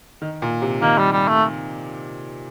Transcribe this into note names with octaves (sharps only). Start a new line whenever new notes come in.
D#3
A#2
C3
D#3 A#3
G3
G3
A3